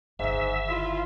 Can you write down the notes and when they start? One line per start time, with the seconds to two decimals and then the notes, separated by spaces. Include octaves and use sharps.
0.19 G1 G#2 D#3 E5
0.69 E4 F4